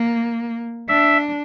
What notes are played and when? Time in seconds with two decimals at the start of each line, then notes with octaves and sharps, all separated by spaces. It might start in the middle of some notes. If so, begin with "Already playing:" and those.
Already playing: A#3
0.88 D4 E5